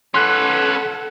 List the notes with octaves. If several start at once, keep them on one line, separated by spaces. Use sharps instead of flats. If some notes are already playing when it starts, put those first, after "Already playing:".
C#4 A4 B4 F#5 C6 F#6